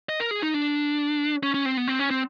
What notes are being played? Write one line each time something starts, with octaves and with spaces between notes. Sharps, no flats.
D#5
A#4
G#4
D#4
D4
C#4
C#4
C4
B3
C4
C#4
C4